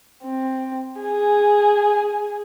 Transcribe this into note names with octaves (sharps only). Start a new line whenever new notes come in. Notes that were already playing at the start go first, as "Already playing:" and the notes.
C4
G#4 G#5